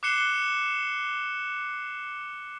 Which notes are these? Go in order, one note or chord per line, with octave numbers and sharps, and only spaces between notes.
D6 F#6 C7 C#7 E7 G7